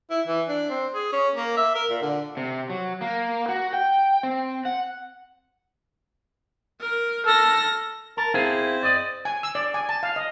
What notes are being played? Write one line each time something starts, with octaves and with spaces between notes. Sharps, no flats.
E4
E3
D4
C4
G#4
C#4
A#3
E5
A#4
A#2
D3
C3
F#3
A#3
F#4
G5
C4
F#5
A#4
A4 F6 A#6
A#4 A5
C4 E4 G#4 F5
D5 D#5
G#5
E6
D5
G#5
A5
F5
D#5